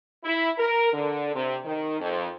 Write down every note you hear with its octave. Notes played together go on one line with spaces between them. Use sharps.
E4
A#4
D3
C3
D#3
F2